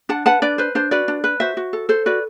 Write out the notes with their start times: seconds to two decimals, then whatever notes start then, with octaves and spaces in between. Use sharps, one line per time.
0.09 D4 F#5 A5
0.26 B4 F#5 A5
0.42 D4 B4 D5
0.58 B4 C5
0.75 D4 C5
0.91 F#4 B4 D5
1.08 D4
1.24 B4
1.40 F#4 C5 E5
1.57 F#4
1.73 A4
1.89 A4 C5
2.06 F#4 B4 D5